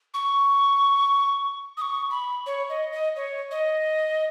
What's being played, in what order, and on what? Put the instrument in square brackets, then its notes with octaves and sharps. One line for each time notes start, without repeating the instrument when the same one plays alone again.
[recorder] C#6
D#6
C#6
B5
C#5
D#5
D#5
C#5
D#5